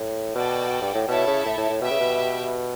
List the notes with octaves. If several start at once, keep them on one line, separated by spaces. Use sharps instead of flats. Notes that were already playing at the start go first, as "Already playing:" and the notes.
Already playing: A2
B2 F#4 A4 D5 G5
G2
A2
B2 E4 A4 C#5 E5 A5
C#3
A2
A2
A2
B2 G4 B4 E5 G5
C#3
B2